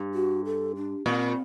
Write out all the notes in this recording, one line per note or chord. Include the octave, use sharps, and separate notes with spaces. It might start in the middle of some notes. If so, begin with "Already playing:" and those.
Already playing: G2
F#4
A4
D4
A#2 C4